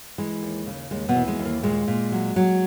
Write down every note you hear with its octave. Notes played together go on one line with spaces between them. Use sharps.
E3 G#3
D#2
C#3
D#2 G#3
B2 B3
E3
G#3
D#2
A#3
A#2 G#3
A#2
F#3
F#3